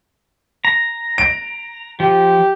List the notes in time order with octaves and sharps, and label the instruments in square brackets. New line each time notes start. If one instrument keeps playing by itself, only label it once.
[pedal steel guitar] A#5
[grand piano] D7
[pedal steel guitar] F3 [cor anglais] G4